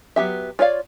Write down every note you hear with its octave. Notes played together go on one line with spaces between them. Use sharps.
F#3 B3 G4 E5
F4 C#5 D5 F5